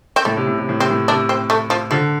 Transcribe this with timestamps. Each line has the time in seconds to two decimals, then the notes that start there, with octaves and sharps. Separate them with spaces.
0.16 C4
0.25 A2 A3
0.37 C3
0.47 A2
0.58 C3
0.69 A2
0.80 C3 C4
0.91 A2
1.08 C3 D4
1.29 C4
1.50 A3
1.70 F3
1.91 D3 F3